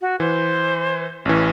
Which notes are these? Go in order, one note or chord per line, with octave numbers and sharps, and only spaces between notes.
F#4
E3 C5
A1 E3 C#4